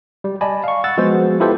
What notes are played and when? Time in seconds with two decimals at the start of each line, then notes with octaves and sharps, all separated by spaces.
0.24 G3
0.41 D5 D#5 G#5 A5 B5
0.64 F5 C#6
0.84 F#5 E6 A6
0.97 F3 G#3 B3 F#4 G#4 C5
1.40 E4 F4 G4 A4 B4 C5